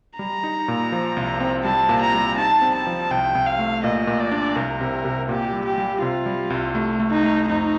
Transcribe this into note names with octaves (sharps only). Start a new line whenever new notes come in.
G3 A#5
D#4
A#2
F3
C2
C4
G3 A5
A#2
A#5
G3
D#4 A5
C4
A5
F3
C2 G5
C2
F5
A3
A#2 D#5
A#2
D5
D4
C2 A#4
C3
C3
A#2 G4
G3
G4
G3
C3 F4
G3
C2
A3
A3
D#4
A3
F2 D#4